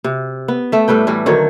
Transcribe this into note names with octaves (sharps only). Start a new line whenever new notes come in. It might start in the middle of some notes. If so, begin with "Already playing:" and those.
C3
B3
A3 E5
A2 G3 B4 G5
A2 E3 G3
D3 D#3 F#3 C#5